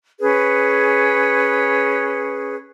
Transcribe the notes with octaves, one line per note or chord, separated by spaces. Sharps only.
C#4 G#4 B4